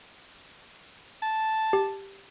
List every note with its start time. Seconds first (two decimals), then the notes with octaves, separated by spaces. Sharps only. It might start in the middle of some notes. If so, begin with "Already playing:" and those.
1.22 A5
1.73 G4